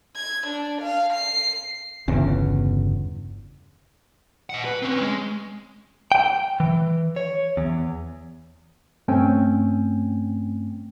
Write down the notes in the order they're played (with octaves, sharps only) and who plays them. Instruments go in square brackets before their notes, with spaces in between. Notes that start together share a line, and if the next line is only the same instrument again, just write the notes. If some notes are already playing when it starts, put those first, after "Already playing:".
[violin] G#6
D4
F5
C7
[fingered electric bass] G1 E2 C#3
[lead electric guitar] D#5 F#5
B4
C4 C#4
G#3
[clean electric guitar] G5
E3
C#5
E2
[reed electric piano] G2 A3 C4 C#4 G5 G#5